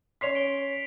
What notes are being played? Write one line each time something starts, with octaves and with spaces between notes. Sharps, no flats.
C#4 C#5 C6 B6 C7 F7
D7 G7